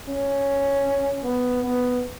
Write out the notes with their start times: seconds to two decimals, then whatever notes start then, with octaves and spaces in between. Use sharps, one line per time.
0.09 C#4
1.24 B3
1.62 B3